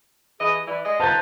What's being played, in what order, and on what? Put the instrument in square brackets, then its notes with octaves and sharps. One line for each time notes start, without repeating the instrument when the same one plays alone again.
[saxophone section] E3 D#5 [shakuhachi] G#4
[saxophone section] E3 [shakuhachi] D5
[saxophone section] G#3 G#4 D#5
[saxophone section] D#4 F4 B4 [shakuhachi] C5 [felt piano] A5 G6 A6